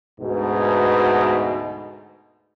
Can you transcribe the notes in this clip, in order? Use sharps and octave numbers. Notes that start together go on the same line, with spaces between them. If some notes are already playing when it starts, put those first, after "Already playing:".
D2 G#2 B2